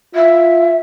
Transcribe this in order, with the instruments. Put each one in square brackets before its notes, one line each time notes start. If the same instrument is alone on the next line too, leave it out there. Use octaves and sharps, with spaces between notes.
[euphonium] F4 [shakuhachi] E5